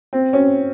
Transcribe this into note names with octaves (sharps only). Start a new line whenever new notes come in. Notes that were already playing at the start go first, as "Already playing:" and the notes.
C4
C#4